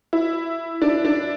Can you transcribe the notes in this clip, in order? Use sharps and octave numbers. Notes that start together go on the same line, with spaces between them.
E4
D4
D4